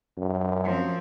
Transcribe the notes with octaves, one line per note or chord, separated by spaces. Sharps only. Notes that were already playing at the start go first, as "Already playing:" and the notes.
F#2
F3 C4